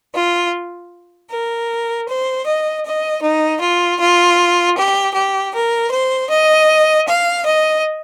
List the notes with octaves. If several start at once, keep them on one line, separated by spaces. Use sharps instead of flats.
F4
A#4
C5
D#5
D#5
D#4
F4
F4
G4
G4
A#4
C5
D#5
F5
D#5